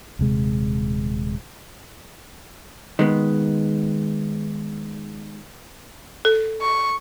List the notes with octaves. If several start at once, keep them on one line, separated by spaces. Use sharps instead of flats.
D#1 C3 G#3
D#3 G#3 B3
A4
C#6